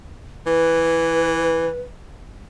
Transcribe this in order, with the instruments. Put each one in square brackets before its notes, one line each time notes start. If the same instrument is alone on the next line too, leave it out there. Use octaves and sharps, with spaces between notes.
[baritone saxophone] E3 [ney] B4